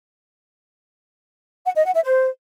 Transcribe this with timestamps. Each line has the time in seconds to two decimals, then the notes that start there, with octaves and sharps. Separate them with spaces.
1.65 F#5
1.75 D#5
1.84 F#5
1.94 E5
2.04 C5